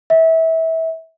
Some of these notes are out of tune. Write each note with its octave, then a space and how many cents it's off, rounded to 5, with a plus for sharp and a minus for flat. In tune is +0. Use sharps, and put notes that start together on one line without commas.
E5 -25